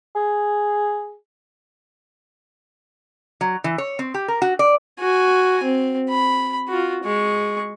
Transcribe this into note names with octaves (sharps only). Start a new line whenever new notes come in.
G#4
F#3
E3
C#5
C4
G4
A#4
F#4
D5
F#4 G#5
C4
B5
F4 F#4
G#3 C#6